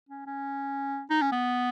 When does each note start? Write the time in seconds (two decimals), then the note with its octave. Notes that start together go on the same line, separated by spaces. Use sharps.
0.09 C#4
0.27 C#4
1.10 D#4
1.22 C#4
1.32 B3